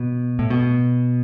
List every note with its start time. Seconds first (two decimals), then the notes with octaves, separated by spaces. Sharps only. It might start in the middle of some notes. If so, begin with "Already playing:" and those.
Already playing: B2
0.39 A2
0.50 B2